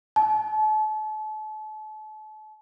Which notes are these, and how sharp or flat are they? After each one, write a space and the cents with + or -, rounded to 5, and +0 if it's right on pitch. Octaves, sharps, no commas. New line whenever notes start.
A5 -35